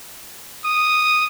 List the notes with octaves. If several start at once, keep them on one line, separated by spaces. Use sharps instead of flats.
D#6